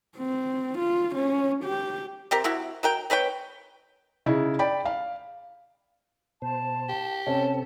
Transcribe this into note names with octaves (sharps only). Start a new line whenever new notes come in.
C4
F4
C#4
G4
C3 C4 G4 A#4
C3 E4 F#4 G4
F#3 A#4 G5
C4 B4 C#5 G5
C#3 D#4 E4
D5 G5 B5
F5
B2 C5 A5
G4
C3 C4 C#4 A4 A5